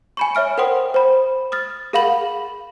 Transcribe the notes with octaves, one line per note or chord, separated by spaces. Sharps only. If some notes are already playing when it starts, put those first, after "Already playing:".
G#5 B5 C#6
C#5 E5 F6 D7
A#4 C5 F#5 G5 C6 D#6
C5 B5
D#6 F6 A6
G#4 A#4 F5 F#5 B5 F#7